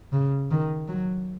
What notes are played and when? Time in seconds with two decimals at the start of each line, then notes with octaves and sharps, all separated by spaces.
0.13 C#3
0.51 D#3
0.88 F#3